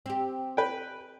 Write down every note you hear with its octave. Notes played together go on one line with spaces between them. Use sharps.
C4 G4
B4 G5